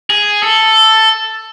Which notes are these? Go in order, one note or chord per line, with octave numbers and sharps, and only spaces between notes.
G#4
A4